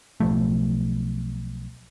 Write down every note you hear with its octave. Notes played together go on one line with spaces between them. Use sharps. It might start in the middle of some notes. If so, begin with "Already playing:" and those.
B1 F3 A3